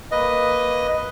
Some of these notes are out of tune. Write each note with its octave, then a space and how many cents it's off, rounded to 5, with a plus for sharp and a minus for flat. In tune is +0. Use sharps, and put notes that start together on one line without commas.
A#3 +0 B4 +0 D#5 +0